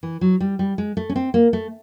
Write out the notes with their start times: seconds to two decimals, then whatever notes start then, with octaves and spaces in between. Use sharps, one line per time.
0.03 E3
0.21 F#3
0.41 G3
0.59 G3
0.78 G#3
0.97 A3
1.09 C#4
1.16 C4
1.34 A#3
1.53 A3